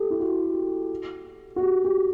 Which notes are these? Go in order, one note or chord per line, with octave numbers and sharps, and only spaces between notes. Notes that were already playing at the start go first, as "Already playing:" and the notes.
Already playing: G4 A4
E4
F#4
F#4
G4
G4